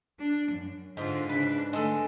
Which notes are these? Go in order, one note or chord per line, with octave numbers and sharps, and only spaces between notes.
D4
F#2
G#2 D3 F4
C#3 D4 B4
D3 G#3 A3 A4